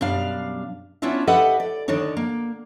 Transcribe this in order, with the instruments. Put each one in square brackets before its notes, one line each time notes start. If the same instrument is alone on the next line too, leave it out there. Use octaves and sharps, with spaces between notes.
[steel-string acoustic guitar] F#2 B2 G3 D4 F5
B3 C#4 D4 E4 F4 E5
G4 A4 B4 D#5 E5 F#5
D5
D2 D3 D#3 D4 D#4 C#5
A#3